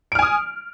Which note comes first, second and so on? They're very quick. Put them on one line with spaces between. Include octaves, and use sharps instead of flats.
D7 F6 G#5 D#6